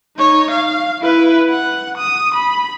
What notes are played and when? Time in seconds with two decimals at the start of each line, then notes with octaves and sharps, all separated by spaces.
0.17 D#4 C#5
0.51 F5
1.02 E4 B4
1.50 F#5
1.98 D#6
2.35 B5